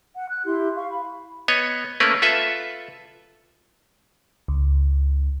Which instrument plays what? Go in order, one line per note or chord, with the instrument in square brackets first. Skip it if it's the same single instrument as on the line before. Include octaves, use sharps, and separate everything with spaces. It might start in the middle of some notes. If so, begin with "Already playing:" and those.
[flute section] F#5
F#6
E4 G4 C6
F5 C#6
B5
[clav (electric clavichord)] B3 C#5 D#5
A3 A#3 C#4 A#4 B4
F4 A4 B4 E5
[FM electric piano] C#2